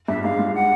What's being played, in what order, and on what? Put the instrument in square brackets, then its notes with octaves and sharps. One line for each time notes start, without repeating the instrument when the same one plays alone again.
[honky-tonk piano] G2 [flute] E5
[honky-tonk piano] G#2 [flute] F5
[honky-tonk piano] G#2
[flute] F#5